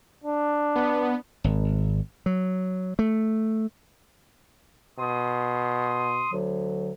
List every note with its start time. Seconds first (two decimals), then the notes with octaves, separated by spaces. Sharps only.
0.24 D4
0.76 B3
1.44 G#1
2.26 F#3
2.99 A3
4.98 B2 C6 D#6
6.32 D2 D3 F#3